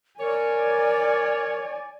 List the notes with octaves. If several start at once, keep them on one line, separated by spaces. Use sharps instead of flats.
A#4 C#5 D5 G#5